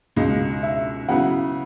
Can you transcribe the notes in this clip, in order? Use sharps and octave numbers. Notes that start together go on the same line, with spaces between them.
C#2 B2 G#3
E5
C#3 F#3 B3 E4 F#5